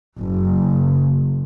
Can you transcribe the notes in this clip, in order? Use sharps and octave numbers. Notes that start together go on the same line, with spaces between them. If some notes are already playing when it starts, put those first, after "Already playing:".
F#1